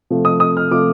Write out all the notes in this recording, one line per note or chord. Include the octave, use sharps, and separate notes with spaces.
C3 F3 A3
D#6
D#6
F6
C3 F3 A3 D6